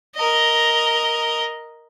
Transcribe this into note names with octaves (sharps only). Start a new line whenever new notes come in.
A#4 D#5